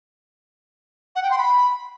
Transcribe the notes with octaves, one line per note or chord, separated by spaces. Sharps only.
F#5
G5
C6
B5